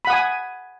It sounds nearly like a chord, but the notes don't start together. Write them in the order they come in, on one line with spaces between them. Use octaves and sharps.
B5 F#5 D#6 G#5